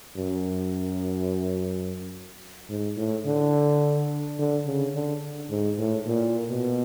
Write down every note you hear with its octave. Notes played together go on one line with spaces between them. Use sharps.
F#2
G#2
A2
D3
D3
C#3
D3
G#2
A2
A#2
B2